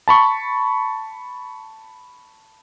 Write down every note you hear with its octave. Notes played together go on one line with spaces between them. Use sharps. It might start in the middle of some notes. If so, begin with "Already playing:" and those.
A5 B5 C#6